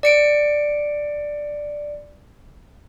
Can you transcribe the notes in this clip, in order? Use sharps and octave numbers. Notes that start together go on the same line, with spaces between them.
D5 C#7 D7